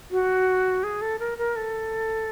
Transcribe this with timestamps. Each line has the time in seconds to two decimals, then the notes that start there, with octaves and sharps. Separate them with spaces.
0.11 F#4
0.84 G#4
1.01 A4
1.19 A#4
1.38 A#4
1.56 A4